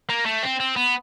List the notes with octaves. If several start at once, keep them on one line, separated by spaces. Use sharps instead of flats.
A#3
A3
C4
C4
B3